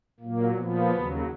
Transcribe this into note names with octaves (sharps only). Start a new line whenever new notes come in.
A#2 F#3 A#3
A#2 F3 B3
D#2 C#3 F#3